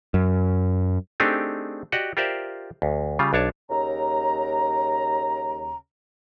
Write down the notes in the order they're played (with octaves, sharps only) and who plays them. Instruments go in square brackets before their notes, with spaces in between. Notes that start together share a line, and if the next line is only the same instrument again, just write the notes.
[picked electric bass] F#2
[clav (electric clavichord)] A3 C4 D4 D#4 G4 G#4
F#4 G4 D5 D#5 F#5
F4 G4 A#4 C5 D5 E5
D2
C#3 G3 F4
B1 D4 C#5 A5
[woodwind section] D#2 C#3 A#5